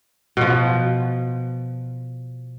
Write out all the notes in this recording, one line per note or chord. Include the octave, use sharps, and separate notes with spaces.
B2 F3